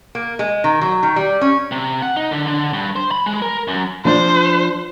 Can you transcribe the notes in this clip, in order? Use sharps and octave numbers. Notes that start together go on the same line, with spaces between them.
A#3
G#3
D#3
F#3
D#3
G3
C#4
C3
F#5
D#4
D3
D3
G2
C5
B5
G#3
A#4
F#2
F3 D4 C5